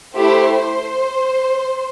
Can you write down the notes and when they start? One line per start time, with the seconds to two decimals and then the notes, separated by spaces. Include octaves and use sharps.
0.15 A3 E4 G4 C5
0.55 C5